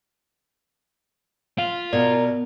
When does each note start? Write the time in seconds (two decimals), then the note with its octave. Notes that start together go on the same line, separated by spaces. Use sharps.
1.58 F4 F5
1.93 B2 A#4 D5